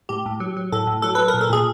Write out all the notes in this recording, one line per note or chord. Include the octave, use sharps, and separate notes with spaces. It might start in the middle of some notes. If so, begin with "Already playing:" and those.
A2 G4
A2
F#3
F#3
A2 A4
A2
F#3 A4
F#3 B4
A#4
A#2
A4
A#2 G#4